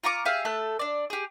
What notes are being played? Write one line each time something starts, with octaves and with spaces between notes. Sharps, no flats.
F4 A#5 C#6 D6
G4 G#4 E5 F5
A3 A4 F#6
D4 D5
G4 G#4